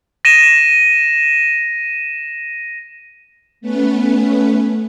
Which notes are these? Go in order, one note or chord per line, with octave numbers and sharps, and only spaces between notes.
A#6 D#7 E7
A3 B3 C#4 B4